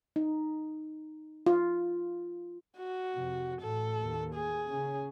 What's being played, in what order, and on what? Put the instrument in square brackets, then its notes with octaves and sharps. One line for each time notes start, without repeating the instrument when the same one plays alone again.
[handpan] D#4
F4
[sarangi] F#4
[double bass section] F2 C3
[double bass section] A1 A2 [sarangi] A4
[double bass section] D#2
[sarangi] G#4
[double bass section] C#3 C#4